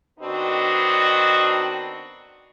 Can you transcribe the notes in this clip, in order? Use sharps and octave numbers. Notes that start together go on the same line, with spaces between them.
D#3 B3 C4 D4 F#4 D#5